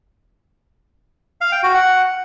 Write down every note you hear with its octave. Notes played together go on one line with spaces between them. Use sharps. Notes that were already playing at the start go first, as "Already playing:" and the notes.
F5
G5
F#4
F#5